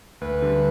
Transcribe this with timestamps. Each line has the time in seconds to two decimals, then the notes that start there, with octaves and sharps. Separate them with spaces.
0.21 D2 B4
0.42 D3 G3 D4